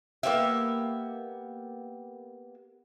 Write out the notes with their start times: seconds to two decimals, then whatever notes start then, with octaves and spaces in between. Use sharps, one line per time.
0.23 A#3 B3 G4 E5